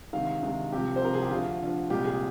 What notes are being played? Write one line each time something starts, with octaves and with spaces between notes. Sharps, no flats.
D2 C3 D#3 G#3 F5
D2 C3 D#3 G#3
C2 C3 F3 G4
C5
C2 C3 F3 A#4
G#4
G4
D2 D3 F3 F4
D2 D3 F3
C2 A#2 G#3 G4
G#4